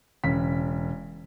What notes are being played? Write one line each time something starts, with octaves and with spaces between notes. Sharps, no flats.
E1 C#3 B6